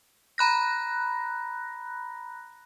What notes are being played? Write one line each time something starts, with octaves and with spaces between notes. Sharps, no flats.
A#5 B5 F#6 A#6